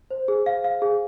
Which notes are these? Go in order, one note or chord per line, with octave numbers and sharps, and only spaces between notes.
C5
G#4
F5
F5
G#4